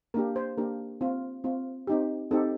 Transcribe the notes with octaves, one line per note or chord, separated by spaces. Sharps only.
A#3 D4 G4 A#4
C5
A#3 D4 G4 A#4
C4 F4
C4 F4
C4 D#4 G4
C4 D#4 G4 A4